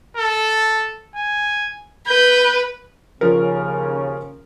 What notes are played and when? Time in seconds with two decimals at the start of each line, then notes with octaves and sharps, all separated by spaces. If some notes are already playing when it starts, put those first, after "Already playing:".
0.17 A4
1.16 G#5
2.08 B4 G6
3.21 D#2 C#3 F3 C#4 A#4